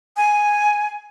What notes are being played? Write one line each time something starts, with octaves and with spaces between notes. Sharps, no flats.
G#5